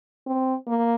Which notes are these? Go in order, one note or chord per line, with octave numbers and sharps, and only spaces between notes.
C4
A#3